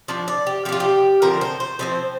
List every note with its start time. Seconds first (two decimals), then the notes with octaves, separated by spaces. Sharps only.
0.08 F3 D4 D5
0.28 D5
0.47 G4
0.65 F3 G4
0.69 D4 F4
0.80 G4
1.22 D3 F3 C4 A#4
1.41 C5
1.60 C5
1.79 D3 F3 C4 C5